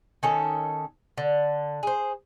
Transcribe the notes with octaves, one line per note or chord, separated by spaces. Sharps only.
D#3 C#4 A4
D3
G#4 C5